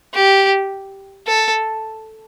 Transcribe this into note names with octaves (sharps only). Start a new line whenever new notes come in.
G4
A4